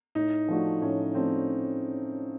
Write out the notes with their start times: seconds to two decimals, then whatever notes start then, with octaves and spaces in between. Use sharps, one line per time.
0.15 A2 D#4
0.48 F3 A3 D4 F#4
0.82 A2 C#4
1.15 F3 A3 C4 D4 F#4